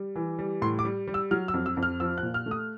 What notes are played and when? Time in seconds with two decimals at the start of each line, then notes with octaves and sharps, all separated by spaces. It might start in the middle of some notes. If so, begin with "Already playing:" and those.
Already playing: G3
0.16 E3
0.39 G3
0.62 A2 C6
0.79 D6
0.85 G3
1.07 G3
1.14 E6
1.31 F#3 F6
1.48 E6
1.54 F2
1.66 E6
1.77 F2
1.83 F6
2.00 F3 E6
2.18 F#6
2.23 A#2
2.34 F6
2.46 A3
2.51 D#6